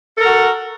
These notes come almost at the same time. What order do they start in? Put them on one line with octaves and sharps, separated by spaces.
A4 A#4 F#4